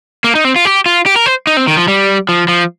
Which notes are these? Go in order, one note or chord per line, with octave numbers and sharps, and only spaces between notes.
A#3
D#4
C4
F4
G4
F4
G4
A#4
C5
D#4
C4
D#3
F3
G3
F3
F3